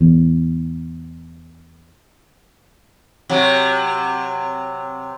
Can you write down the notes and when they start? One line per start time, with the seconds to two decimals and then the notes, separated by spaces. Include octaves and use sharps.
0.01 E2 A2
3.29 C3 F#3